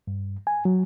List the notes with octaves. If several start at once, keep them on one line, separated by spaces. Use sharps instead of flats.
G2
G#5
F#3